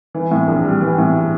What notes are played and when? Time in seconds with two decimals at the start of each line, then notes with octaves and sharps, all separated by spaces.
0.15 E3
0.31 A2
0.48 A#1
0.65 G3
0.81 E3
0.98 A2